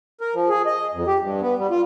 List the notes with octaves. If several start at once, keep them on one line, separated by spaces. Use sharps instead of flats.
A#4
F3
G#4
D#5
F2
G4
G2
B3
G3
F4